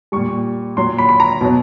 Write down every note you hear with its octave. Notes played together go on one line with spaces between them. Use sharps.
A#2 G3 C#6
A#2 F#3 C6
B5
B5
A#5
B2 F#3